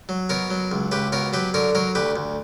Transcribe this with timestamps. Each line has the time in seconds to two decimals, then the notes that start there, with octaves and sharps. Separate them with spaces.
0.09 F#3
0.29 B2 A#4 C#5
0.50 F#3
0.71 C#2
0.91 C#2 G4 B4
1.12 B2 A#4 C#5
1.33 F#3 G4 B4
1.54 D3 A#4 C#5
1.75 F#3 A#4 C#5
1.95 D2 G4 B4
2.16 D2